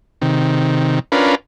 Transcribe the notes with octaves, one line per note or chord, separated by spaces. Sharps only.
C3 D#3
C#4 D4 F4 A#4 B4